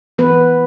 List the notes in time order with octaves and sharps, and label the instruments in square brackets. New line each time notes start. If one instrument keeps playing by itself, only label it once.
[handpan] E3 B3 B4